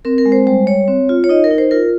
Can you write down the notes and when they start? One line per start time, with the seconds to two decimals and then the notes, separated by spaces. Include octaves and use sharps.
0.05 C4 A#4
0.18 A#4
0.26 G#3
0.32 C5
0.47 G3 C5
0.67 G3 C#5
0.88 C4
1.09 F4
1.24 C#5
1.29 D#4 D#5
1.44 A#4
1.51 D#4
1.58 C5
1.71 F4 A#4